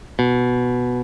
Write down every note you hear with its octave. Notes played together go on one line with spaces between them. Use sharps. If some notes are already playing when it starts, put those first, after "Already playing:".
B2